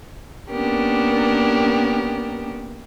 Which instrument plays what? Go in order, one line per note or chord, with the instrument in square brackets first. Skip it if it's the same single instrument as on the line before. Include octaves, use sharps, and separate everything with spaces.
[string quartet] A#3 B3 C#4 D4 G4 A#4